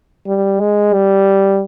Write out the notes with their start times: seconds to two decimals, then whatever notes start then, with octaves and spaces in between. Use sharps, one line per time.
0.27 G3
0.60 G#3
0.93 G3